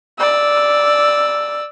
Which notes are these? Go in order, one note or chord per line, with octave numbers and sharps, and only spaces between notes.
D5 E6